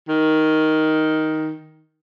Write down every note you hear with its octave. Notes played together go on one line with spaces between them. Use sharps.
D#3